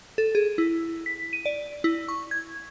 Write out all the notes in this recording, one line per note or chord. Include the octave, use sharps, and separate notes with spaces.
A4
G#4
E4
B6
D#7
D5
E4
C#6
G#6